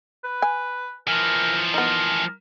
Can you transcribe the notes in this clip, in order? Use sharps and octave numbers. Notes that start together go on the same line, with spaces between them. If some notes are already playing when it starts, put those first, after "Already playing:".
B4
G#5
E3 F3 A#4
B3 D#4 A#4